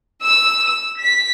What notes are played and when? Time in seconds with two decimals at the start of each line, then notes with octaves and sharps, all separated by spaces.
0.23 E6
0.66 E6
0.99 B6